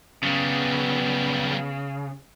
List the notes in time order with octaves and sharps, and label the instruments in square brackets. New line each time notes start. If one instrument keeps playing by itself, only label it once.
[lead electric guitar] C#3 [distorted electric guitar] F#3 G3 [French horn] B3